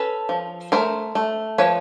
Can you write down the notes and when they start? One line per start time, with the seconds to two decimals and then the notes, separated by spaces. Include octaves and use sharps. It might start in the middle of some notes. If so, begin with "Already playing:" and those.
Already playing: C#4 A4 B4
0.29 F3
0.72 A3 A#4 C5
1.15 A3
1.58 F3 B4 C#5